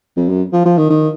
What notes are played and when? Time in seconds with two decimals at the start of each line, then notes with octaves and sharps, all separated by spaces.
0.17 F2
0.29 F#2
0.53 F3
0.65 F3
0.78 D#3
0.90 D#3